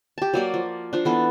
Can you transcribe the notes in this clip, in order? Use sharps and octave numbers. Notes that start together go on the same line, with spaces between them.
G4 A5
F#3 A#3 D5
F3
F3 D4
E3 B3 A4